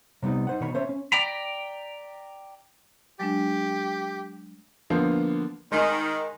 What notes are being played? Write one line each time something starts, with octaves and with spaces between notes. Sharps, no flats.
C3 G3 B3 D#4
D#4 C5 F#5
B2 D#3 C#5 B5
C#4 C5 C#5 E5
C#4
D5 G5 A#5 B5
F#3 G#3 D4 G4
D3 F3 A#3 B3
D#3 G#3 D#4